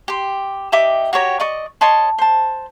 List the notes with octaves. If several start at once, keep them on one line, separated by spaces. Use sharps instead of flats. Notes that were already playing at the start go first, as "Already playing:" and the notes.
G4 C6
D#4 G4 E5 D6
F#4 G4 C#5 A#5
D5 D#5 C#6
C#5 D#5 A5 C6
C5 A5